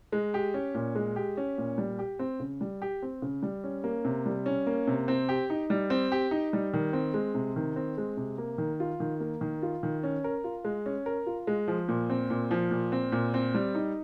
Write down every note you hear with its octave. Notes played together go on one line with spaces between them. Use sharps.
G#3
G4
C#4
A#2
G#3
G4
C#4
A#2
G3
G4
C4
C#3
G3
G4
C4
C#3
G3
C#4
A#3
C3
G3
C#4
A#3
C3
C4
G4
D#4
G3
C4
G4
D#4
G3
D#3
C4
G#3
C3
D#3
C4
G#3
C3
A#3
D#3
F4
D#3
A#3
D#3
F4
D#3
C#4
A#4
F4
G#3
C#4
A#4
F4
G#3
F3
A#2
C4
A#2
F3
A#2
C4
A#2
C4
G3
D#4